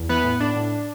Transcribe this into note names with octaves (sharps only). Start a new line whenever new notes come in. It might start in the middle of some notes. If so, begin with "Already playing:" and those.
Already playing: E2
E3 B3 B4
A2
A2 D4
A2